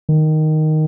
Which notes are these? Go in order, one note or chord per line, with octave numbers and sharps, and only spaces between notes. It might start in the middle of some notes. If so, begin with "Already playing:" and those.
D#3